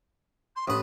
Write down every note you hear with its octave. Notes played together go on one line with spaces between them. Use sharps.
C6
A1 B4 D#6